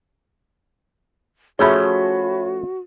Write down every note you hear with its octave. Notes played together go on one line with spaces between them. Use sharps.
F3 A3 C#4 F#4 G#4 C#5 E5 B5